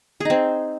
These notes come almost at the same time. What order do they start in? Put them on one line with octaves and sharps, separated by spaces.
G#4 D#4 C4